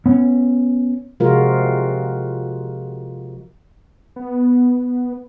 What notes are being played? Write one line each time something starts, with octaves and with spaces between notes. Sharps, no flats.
B3 C#4
C3 F3 G#3 F4 F#4 A#4
B3